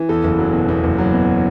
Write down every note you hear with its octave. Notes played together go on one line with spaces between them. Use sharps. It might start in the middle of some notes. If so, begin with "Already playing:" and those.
Already playing: E3
E2 A4
F#1
F#3
B2
E2
F#1
F#3
B2